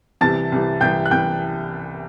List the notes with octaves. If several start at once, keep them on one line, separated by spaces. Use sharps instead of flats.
C2 C3 E3 A5 A6
C2 C3 E3
C2 C3 E3 G5 G6
F#6
C2 C3 E3 G5 G6